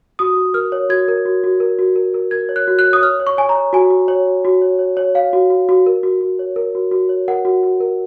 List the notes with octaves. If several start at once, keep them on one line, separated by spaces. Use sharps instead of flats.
F#4 D#6
F#4
A#4 F6
C#5
F#4 G#6
A#4
F#4
F#4
A#4
F#4
A#4
A#4
A#4 G#6
C#5
F#6
F#4
F#6
C#5
D#6
C#5 F6
C#5
C#6
C#5 G#5
A#5
C#5
F#4 G#5
F#4
C#5
F#4
F#4
C#5
C#5
C#5
C#5 F5
F#4
F#4
F#4
A#4
F#4
F#4
C#5
A#4
F#4
F#4
C#5
A#4 F#5
F#4
F#4
A#4